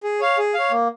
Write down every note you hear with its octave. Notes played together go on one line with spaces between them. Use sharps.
G#4
C#5 F5
G#4
C#5 F5
A#3